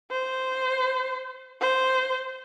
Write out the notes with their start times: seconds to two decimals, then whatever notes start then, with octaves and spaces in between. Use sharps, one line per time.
0.11 C5
1.61 C5